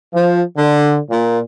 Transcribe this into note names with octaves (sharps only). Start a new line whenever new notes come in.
F3
D3
A#2